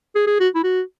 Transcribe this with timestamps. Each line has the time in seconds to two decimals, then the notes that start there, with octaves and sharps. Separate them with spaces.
0.15 G#4
0.27 G#4
0.40 F#4
0.55 E4
0.64 F#4